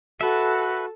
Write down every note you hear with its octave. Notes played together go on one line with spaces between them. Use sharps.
F#4 A4 B4 E5